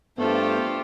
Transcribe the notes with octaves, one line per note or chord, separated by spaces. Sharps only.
G2 A3 B3 F4 G4 A4 C5